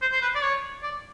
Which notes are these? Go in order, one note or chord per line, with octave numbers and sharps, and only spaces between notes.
C5
C5
B4
D5
C#5
D5